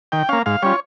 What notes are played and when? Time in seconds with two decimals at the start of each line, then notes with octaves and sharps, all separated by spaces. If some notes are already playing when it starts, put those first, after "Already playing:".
0.12 D#3 G5
0.29 A#3 C#4 F5
0.46 G#2 F5
0.62 G3 C#4 F4 C#5